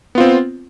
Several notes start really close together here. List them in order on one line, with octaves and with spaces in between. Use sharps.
B3 F4 C4